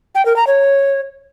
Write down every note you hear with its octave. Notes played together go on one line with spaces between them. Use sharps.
G5
A#4
A#5
C#5